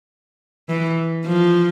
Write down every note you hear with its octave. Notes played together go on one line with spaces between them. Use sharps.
E3
F3